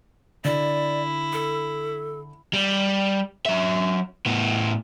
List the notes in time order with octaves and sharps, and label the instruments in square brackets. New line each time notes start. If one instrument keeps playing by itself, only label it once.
[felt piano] D3 [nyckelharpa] E4 [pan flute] D5
[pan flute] A4
[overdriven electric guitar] G3
F#3 E5
A2 B3